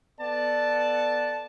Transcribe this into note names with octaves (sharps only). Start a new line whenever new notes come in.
B3 A4 D5 F#5 A5